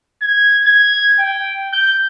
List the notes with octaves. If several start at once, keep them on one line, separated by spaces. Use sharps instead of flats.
G#6
G#6
G5
G6